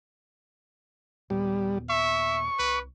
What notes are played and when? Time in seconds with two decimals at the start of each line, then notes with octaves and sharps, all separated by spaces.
1.30 D#1 A#2 G3 B3
1.90 E5 C#6
2.59 C2 B4